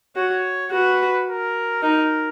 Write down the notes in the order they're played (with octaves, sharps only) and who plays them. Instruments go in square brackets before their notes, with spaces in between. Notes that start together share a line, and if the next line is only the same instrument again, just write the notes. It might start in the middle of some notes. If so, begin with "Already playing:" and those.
[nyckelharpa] F#4 [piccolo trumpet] C#5
[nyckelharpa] F#4 [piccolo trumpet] B4
[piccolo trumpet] A#4
[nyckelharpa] D#4 [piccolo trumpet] A#4